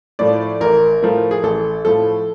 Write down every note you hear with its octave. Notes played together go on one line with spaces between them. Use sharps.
A2 F3 A3 D5
A1 A#4
A2 F3 A3 A#4
G#4
A1 A4
A2 F3 A3 A4